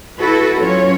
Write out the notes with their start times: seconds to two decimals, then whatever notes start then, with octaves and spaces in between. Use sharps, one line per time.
0.19 E4 F#4 A4 B4
0.60 F#3 C#4 F4 C#5